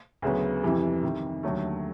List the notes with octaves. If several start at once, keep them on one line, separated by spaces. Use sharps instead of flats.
D2 C#3 F#3 B3
F2 C3 E3 G3
C3 D#3 G3
D#2 D3 F#3 A3